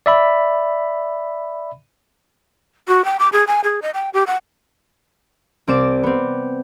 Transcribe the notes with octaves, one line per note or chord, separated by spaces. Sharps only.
D5 E5 B5
F#4
G5
D6
G#4
G#5
G#4
D#5
G5
G4
F#5
C2 C4 D5 D6 E7
B3 C4